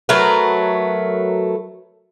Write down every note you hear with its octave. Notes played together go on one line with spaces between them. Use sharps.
F#3 A3 A#4 B4